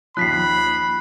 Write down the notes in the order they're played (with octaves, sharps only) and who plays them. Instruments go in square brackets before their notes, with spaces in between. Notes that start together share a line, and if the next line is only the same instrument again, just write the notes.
[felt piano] D#2 F3 [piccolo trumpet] B5 [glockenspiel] F#6 B6 C7